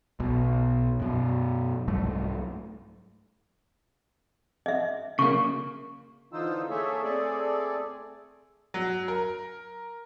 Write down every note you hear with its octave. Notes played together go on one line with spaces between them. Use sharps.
B1 B2
F#2 B2
C2 G#2 F#3 A3
D#5 E5
C#3 A#3 C#6
D3 E3 D#4 F4 C5 E6
A3 A#3 G#4 A4 C#5 E5
A3 C4 G#4 A4 D5
F#3
A#4